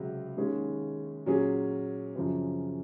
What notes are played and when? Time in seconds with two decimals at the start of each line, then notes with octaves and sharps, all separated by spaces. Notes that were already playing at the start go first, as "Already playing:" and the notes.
Already playing: C#2 C3 F#3
0.36 D#2 D#3 G#3 C#4 G#4
1.26 A#2 F#3 C#4 G#4
2.16 F#2 C#3 F3 C4